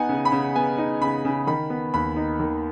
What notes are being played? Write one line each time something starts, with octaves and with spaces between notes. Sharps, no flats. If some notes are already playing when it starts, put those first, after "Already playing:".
Already playing: B3 D#4 F#5 G#5
C#3
B5
C#3
B3 G#5
D#4
C#3 B5
C#3
D#3 B5
B3
D#2 B5
D#4
D#3